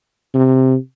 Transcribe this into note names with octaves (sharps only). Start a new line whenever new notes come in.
C3